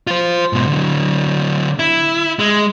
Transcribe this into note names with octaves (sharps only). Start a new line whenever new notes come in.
F4 C5
G#2 B2
D3 F#3
E4
G#3